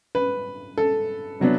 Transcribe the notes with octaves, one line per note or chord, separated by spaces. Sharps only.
B4
A4
C3 F#3 B3 D4